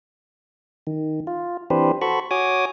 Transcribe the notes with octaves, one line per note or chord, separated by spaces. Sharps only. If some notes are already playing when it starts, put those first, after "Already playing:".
D#3
F4
E3 C4 D4 G4 B4 C5
F#4 A4 C5 B5 C#6
F#4 C#5 G#5 D6 D#6